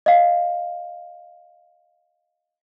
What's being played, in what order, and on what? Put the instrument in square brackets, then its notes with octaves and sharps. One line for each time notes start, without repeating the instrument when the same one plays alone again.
[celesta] D#5 F5